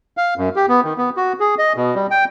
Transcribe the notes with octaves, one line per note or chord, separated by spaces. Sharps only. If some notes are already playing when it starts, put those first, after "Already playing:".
F5
F#2
G4
B3
D#3
B3
F#4
G#4
D#5
B2
G3
G5